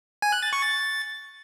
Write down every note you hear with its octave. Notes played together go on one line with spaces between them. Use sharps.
G#5
F#6
A6
C#6
A6